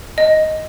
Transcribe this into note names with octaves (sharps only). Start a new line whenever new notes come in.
D#5